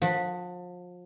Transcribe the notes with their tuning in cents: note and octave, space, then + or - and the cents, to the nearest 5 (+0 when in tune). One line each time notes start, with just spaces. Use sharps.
F3 +35 F#5 +0